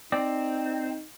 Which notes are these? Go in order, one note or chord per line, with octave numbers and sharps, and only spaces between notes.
C4 D#4 D5